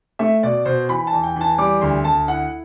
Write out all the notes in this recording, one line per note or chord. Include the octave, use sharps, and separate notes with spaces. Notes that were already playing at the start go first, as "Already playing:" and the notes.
A3 E5
B2 D5
B2 C5
E3 B5
A5
E2
G5
E3 A5
G3 D6
D2 C6
D2 A5
E4 F#5